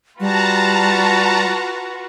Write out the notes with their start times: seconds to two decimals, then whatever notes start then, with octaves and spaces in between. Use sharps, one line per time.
0.20 G3 F4 F#4 B4 A5 A#5